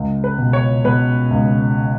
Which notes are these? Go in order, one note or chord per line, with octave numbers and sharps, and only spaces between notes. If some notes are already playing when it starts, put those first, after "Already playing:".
Already playing: C#2
B4
B2
C#5
B2 B4
C#2